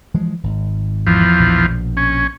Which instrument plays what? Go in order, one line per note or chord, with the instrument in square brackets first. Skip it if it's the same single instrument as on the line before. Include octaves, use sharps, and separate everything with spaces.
[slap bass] E3 F3 G#3
G#1
[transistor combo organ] E2 F3
[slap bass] A#1 B2
[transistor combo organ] C#4